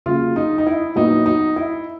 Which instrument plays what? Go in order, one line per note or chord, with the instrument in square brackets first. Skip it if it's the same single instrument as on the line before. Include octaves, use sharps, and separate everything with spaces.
[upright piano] C#3 F#3 A#3 F4
D#4
D#4
E4
A#2 F#3 B3 D#4
D#4
E4